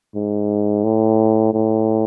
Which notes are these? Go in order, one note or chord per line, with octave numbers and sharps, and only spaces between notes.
G#2
A2
A2